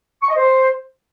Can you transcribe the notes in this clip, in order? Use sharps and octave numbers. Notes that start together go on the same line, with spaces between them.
C#6
D#5
C5